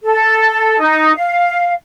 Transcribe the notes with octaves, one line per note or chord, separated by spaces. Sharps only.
A4
D#4
F5